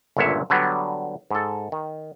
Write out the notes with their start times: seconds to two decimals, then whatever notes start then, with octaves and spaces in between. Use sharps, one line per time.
0.17 G1 C#2 A#2 D3 C#5 E5
0.50 D3 F#3 G3 B3
1.31 G#2 A4
1.72 D#3